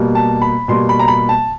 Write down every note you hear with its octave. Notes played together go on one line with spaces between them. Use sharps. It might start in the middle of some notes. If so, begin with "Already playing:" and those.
Already playing: B2 G3 A#3
A5
B5
B2 G3 A#3 C6
B5
A#5
B5
A5